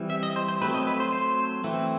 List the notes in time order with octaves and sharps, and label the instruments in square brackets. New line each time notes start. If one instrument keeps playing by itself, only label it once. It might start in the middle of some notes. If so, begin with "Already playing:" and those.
Already playing: [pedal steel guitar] E3 G3 C4
E5
D#5
C5
C5
F#3 A3 C4 B4
D#5
B4
C5
C5
E3 A3 C4